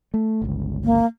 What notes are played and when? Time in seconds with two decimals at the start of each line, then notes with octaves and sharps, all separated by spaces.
0.14 A3
0.42 G1 C#2
0.84 A#3